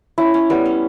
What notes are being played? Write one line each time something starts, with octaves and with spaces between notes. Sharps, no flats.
C#4 E4
C#4
G3 B3
C#4